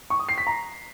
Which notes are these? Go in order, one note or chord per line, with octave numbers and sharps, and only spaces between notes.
C#6
D#6
C7
B6
A#5